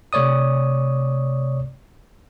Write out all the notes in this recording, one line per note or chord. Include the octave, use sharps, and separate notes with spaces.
C3 A3 C#5 D5 D#6